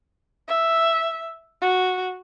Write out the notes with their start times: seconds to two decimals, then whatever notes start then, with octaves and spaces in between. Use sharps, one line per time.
0.48 E5
1.61 F#4